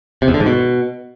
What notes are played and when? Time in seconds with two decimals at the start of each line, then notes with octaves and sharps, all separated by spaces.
0.22 C3
0.28 E2
0.34 D3
0.40 G#2
0.46 B2